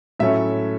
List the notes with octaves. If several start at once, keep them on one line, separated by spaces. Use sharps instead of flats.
A2 F#3 A3 C#4 E5